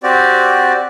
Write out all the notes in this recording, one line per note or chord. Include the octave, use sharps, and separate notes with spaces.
C4 F#4 G4 D5